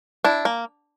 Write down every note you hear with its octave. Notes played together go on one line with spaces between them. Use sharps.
D4 E4
A#3